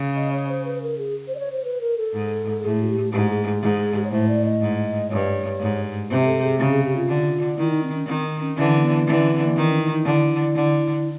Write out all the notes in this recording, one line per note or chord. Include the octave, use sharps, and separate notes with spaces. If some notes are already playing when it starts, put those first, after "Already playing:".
Already playing: C#3
D#5
C#5
C5
B4
A#4
G#4
C5
D5
C#5
C5
B4
A#4
A4
G#2
A2 G#4
F#4
G4
G#2 G4
G#4
G#4
G#2 G#4
G#4
G4
C#5
A2 C5
D5
D#5
G#2
G2 C#5
G#2
C3 C5
A4
G#4
C#3 G4
G#4
G4
F4
D3
D#3 E4
D#4
C4
C#4
D#3 C4
C#4
D3 E3 C#4
C4
B3
D3 E3 C4
C#4
C4
A#3
D#3 C4
C#4
D#4
D#4
D3 E4
D3